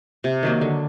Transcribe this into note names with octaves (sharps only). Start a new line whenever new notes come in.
C3
D#3 F#3 A#3
D3